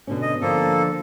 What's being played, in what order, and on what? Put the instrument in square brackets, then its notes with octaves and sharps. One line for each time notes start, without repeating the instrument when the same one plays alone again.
[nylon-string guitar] B2 D3 C#4
[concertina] D#5
[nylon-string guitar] D3 F3 [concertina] A#3 A4